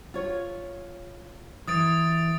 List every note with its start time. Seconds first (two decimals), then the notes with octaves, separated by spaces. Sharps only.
0.14 F4 C#5
1.68 E3 D#6 A6 D7